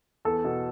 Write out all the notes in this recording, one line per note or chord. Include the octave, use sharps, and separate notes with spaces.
E2 A4
B2